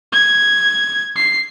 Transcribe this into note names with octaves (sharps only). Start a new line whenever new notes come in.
G#6
C7